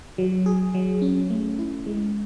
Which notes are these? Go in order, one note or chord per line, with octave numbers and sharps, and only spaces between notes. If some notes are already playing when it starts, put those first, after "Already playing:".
F#3
G#4
F#3
C#4
A3
E4
G#3